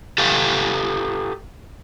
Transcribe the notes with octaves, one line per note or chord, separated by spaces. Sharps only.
G4 A4 B4 F5